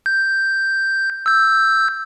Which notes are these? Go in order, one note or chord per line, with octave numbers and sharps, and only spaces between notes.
G6
E6 G6